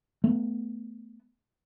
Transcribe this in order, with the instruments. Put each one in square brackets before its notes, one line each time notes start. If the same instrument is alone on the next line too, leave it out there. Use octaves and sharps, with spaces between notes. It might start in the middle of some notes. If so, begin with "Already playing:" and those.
[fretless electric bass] A3 B3